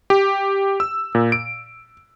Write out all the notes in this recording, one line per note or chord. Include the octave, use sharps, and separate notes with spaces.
G4
E6
A#2
D7